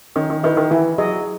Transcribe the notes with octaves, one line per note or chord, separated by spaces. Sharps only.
D#3 C#4
D#3
D#3 E4 B4 E5
D#3
E3 E4
F#3 G#4 D#5